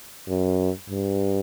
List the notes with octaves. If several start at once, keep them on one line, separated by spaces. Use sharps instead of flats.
F#2
G2